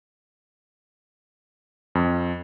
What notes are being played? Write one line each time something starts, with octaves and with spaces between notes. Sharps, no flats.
F2